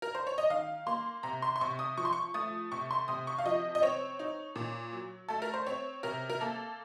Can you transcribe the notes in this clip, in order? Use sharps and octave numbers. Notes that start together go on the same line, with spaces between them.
A#4
C5
C#5
D#5
D#3 F5
A#3 C6
C3 A#5
C6
C6
C3 C#6
D#6
F3 C#6
C6
C#6
A3 D#6
C3 C#6
C6
C3 D#6
C#6
F5
F3 D#5
D#5
C4 C#5
D#4
A#2
F#3
A3 A4
A#4
C5
C4 C#5
C3 A#4
A#4
A#3 A4